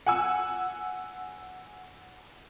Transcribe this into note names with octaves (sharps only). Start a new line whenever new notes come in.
F#5 G#5 E6